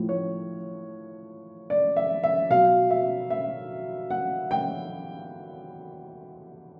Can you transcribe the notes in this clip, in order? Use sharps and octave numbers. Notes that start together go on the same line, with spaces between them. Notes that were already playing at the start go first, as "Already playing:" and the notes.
Already playing: A2 F3
C#5
D5
E5
E5
B2 F#3 F5
E5
E5
F#5
G5